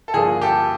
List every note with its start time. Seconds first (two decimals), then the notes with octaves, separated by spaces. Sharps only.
0.08 A4
0.14 G2 D3 F3 A#3 G#4
0.42 G4 A4